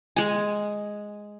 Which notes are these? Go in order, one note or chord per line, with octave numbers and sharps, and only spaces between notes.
G#3 G#5